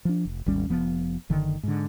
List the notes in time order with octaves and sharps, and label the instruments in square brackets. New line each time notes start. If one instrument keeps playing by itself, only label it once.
[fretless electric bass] F3 D4
F1
G#1 D#2 G3 C#4
F1 F3 B3
F#1 D3 D#3
G#2 D3